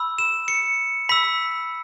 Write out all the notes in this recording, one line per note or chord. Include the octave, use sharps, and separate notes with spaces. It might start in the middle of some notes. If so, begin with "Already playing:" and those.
Already playing: B5 E6
E7
C#7
B5 E6 B6